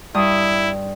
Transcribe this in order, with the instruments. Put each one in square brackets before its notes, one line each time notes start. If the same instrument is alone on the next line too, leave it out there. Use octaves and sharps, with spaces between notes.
[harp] G2 D#6 [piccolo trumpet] E4